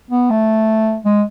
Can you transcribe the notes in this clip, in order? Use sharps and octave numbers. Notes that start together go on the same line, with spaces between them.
B3
A3
G#3